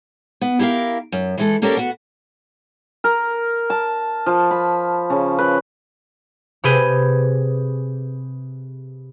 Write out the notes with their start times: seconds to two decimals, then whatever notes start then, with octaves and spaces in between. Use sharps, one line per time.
0.41 B3
0.59 E4 G4 G#4 A#4 F5
1.12 F#2
1.38 E3 G#3 A4
1.62 A#3 C#4 D4 G4 A4 A#4
1.77 B3 F#4
3.04 A#4
3.70 A5
4.26 F3
4.51 B5
5.10 C#3
5.39 B4
6.64 C3 G4 G#4 B4 G6 D#7